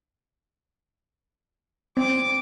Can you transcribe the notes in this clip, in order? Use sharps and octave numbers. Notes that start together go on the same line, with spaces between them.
C4 D6